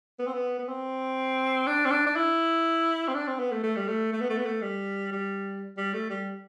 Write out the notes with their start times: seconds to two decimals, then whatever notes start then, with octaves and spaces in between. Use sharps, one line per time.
0.19 B3
0.27 C4
0.34 B3
0.59 B3
0.68 C4
1.67 D4
1.85 C4
1.91 D4
2.07 D4
2.16 E4
3.08 C4
3.15 D4
3.27 C4
3.39 B3
3.52 A3
3.63 A3
3.76 G3
3.88 A3
4.13 A3
4.21 B3
4.30 A3
4.38 B3
4.46 A3
4.62 G3
5.12 G3
5.77 G3
5.94 A3
6.10 G3